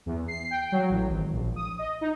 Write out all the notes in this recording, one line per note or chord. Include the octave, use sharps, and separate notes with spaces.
E2
C7
G5
F#3
A1
G#1
A#1
D#6
D#5
D#4